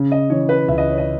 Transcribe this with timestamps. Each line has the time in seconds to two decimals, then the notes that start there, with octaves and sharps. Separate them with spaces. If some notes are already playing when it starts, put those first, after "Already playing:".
Already playing: C#3
0.12 D#5
0.30 E3 C#5
0.49 B4
0.68 C#2 E5
0.78 D#5
0.88 C#5
0.98 D#5